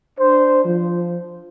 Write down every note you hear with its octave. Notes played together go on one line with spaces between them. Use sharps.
D4 C5
F3